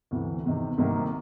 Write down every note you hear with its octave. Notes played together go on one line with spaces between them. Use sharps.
D2 C3 E3
E2 C3 D#3
C2 C3 D#3 F#3 A#3